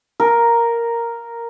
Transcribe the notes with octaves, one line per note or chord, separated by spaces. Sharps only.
A#4